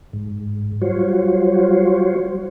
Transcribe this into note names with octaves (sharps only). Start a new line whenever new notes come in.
G#2
F#3 G3 F4 F#4 C5 C#5